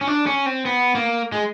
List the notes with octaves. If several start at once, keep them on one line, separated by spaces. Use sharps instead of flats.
C#4
D4
C#4
C4
B3
A#3
G#3